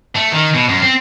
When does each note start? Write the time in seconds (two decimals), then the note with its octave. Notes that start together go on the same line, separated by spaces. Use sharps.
0.15 A3
0.32 D#3
0.54 B2
0.69 F#2
0.82 C4